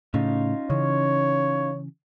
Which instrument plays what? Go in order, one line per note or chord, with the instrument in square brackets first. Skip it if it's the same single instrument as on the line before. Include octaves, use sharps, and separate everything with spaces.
[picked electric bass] A2 C#3 [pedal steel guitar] C#4 D#4 F4
[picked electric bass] C#3 E3 [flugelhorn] C#5